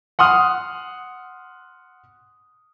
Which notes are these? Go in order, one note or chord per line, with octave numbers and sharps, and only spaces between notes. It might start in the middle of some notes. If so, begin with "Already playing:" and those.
F#5 C6 D#6 F6